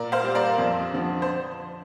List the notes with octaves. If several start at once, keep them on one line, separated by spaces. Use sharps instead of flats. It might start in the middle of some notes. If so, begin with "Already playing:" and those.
Already playing: A#2 A#4 D5
C5 F5
G3 A#3
A#4 D5
F2
D3 F3
C5